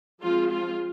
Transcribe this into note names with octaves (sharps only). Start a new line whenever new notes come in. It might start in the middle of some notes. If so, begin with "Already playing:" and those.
F3 G#3 C4 F4
F4